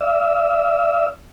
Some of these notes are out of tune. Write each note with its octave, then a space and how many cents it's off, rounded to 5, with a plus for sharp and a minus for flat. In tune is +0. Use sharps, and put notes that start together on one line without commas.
D5 -10 F5 -45 E6 -20